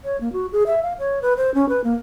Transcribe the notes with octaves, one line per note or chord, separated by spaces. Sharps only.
C#5
A#3
F#4
G#4
E5
F5
C#5
B4
C5
C#4
B4
A#3